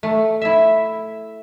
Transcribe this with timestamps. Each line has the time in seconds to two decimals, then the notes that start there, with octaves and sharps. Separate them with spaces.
0.03 A3
0.42 E4 E5